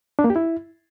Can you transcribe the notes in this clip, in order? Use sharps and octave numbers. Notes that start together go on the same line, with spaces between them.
D4
A#3
G4
E4